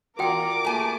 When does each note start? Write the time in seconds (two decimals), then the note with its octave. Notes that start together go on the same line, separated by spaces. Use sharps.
0.19 E2 F4 F#4 A#4 D5 G5 D6
0.64 A3 A#3 G#4 G#5 A5